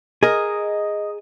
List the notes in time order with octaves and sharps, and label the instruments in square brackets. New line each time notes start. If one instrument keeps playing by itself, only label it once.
[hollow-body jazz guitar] G#4 A#4 [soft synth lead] D#5